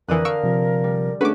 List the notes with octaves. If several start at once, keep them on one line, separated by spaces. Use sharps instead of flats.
F2 D3 E3 A#4 D#6 F#6
F5 C#6 E6 D7
C3 F3
G3
A3 C#4 D4 F#4 G#4 A4 B4 D6